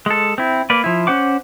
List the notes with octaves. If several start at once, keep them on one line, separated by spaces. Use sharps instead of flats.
G#3 A4
C4 E4
A#3 B4 D5
F3 E4
C#4 C5 F#5 D6